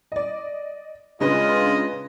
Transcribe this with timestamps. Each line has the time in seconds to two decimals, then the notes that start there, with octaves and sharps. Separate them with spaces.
0.12 D5 D#5
1.21 C#3 G#3 D4 F4 B4 D#5